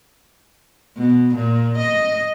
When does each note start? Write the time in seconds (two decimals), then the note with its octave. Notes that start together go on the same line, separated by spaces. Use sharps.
0.97 B2
1.36 A#2
1.79 D#5